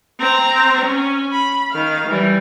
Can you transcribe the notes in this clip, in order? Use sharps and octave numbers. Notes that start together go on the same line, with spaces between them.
C4 A#5
C#4
B5
D#3 F5
E3 G3